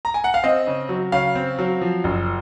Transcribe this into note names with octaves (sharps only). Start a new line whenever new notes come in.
A#5
G#5
F#5
F5
C4 D#5
C#3
F#3
C#3 F5
C4
F#3
F3
F#1